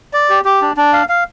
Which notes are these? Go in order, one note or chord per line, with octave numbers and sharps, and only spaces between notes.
D5
G4
G4
D4
D4
F5
F5